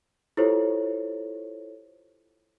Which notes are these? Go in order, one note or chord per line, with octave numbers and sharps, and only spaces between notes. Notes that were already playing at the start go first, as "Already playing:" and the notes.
E4 F4 G4 A4 C5 C#5